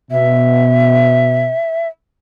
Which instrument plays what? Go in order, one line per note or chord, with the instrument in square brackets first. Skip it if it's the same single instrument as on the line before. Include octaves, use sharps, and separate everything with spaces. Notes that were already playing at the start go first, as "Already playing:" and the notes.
[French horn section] B2 [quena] E5